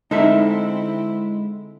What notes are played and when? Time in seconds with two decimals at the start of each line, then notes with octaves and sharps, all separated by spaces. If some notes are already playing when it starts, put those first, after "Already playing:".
0.11 D3 G#3 C4 D#4 E4 A4 E5